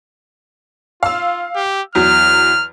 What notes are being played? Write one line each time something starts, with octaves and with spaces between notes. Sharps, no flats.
F4 F5 E6
G4
E2 F#3 F6